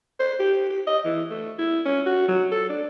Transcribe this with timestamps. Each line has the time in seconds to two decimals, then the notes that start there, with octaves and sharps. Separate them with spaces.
0.20 C5
0.39 G4
0.69 G4
0.87 D#5
1.05 E3
1.30 A3
1.59 E4
1.85 C#4
2.06 F#4
2.28 F#3
2.52 A4
2.69 D4